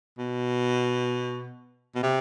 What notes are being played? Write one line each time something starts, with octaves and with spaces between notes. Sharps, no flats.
B2
B2
C3